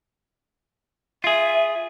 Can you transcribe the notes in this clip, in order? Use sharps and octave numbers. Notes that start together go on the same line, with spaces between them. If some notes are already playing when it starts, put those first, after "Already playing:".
F4 G#4 E5